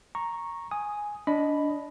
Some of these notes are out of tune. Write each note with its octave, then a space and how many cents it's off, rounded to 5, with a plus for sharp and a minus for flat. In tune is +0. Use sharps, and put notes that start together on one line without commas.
A#5 +0 C#6 -10
G#5 +0 D#6 +0
D4 -20 D#5 +0 B5 +0